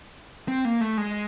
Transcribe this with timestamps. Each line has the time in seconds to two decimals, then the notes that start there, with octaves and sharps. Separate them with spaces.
0.48 C4
0.65 A#3
0.81 A3
0.97 G#3